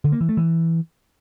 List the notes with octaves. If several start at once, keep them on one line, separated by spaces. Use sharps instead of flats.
D3
A#3
E3
A3
E3